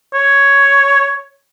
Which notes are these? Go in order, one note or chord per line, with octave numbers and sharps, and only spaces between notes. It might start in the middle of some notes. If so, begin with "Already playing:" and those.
C#5